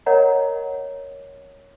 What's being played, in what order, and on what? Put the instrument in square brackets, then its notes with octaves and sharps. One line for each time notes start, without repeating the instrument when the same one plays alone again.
[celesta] A#4 C#5 D#5 F#5 A#5